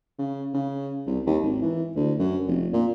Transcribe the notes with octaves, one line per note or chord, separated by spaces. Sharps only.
C#3
C#3
C2
D#2
G#1
E3
D2
F#2
F1
A#2